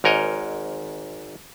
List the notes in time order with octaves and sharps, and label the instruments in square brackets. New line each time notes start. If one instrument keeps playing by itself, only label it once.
[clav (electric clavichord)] G#1 G#2 A#4 C#5 D#5